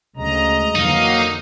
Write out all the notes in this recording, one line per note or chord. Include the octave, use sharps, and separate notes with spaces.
D2 C#3 G#3 D#5 A#5
F2 D3 E3 F#3 A#3 D#4 F5